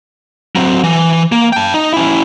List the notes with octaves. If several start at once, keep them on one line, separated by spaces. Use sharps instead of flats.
F#3 C4
E3
A#3
G5 A5
D#4
C#4 E4